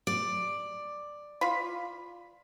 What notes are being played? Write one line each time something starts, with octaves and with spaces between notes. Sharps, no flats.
D5
F4 B5